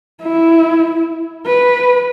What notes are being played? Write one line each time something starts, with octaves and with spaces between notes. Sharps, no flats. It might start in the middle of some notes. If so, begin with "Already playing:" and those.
E4
B4